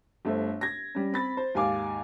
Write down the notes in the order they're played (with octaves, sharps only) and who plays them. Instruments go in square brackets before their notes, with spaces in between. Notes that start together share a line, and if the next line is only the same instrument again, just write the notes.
[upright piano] G1 A3 C5
G#6 A#6
G3 C#4
C4 B5 A6
C5
D#2 G#2 F5 G#5 D6